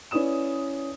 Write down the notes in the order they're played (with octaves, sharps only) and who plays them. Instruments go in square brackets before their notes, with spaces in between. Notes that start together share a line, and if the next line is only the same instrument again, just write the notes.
[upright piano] C#4 E4 B4 D5 D#6 E7